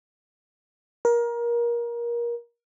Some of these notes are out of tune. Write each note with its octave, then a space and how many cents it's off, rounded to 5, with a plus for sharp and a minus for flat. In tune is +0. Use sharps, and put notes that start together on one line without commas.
A#4 +25